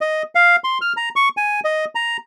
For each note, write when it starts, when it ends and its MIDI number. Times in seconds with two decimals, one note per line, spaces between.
0.01 0.23 75
0.35 0.56 77
0.64 0.78 84
0.81 0.93 89
0.97 1.09 82
1.16 1.29 85
1.37 1.60 80
1.64 1.85 75
1.95 2.17 82